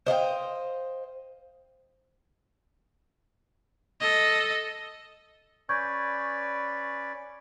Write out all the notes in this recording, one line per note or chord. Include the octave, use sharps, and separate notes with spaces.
C5 D#5 F5 G5
A4 D#5
C#4 B4 D5 C#6 G6 G#6